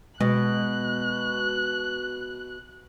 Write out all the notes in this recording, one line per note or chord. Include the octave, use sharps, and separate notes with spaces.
B2 G#3 F#6